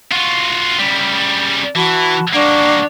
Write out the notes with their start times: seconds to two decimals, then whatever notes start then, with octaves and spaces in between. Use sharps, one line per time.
0.12 F4 F#4
0.79 C#3 G3
1.75 E3 F#4 A5 B5
2.33 G3 A#3 D4 F#5 C#6